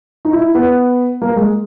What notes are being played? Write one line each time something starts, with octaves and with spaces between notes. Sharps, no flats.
D#4
E4
B3
A#3
G#3